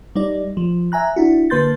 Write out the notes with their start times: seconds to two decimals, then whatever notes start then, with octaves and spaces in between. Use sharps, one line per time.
0.16 G3 D#4 D5
0.57 F3
0.92 E5 G#5 A#5 F#6
1.16 D4 E4 F#4
1.50 D3 A#3 B4 C6 G6 A6